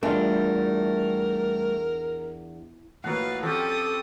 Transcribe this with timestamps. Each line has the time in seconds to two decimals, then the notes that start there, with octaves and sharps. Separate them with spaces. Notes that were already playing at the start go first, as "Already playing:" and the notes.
0.03 E2 G3 A3 D4 F4 A#4
3.04 A2 F3 F#3 A#3 B4 F5 F#5
3.43 F3 C4 C#4 G4 A4 G5 D#6